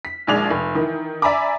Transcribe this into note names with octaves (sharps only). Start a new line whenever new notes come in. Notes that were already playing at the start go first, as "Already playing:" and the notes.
B6
A#1 D#2 G#3 D5 F7
F1
D#3 E3
D5 E5 G#5 A#5 B5 D6